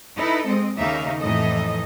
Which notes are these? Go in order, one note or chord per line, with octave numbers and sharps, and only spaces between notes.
D#4 E4 A4 B4
G#3 C4 D#5
D#2 C#3 A#3 D#4 E5 F5
F2 A2 E3 D#4 A4 D#5